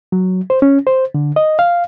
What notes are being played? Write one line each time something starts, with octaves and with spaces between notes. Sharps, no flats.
F#3
C5
C#4
C5
D3
D#5
F5